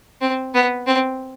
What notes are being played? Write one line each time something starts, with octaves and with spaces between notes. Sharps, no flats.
C4
B3
C4